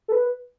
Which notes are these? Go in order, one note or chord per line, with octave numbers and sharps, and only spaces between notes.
A4
B4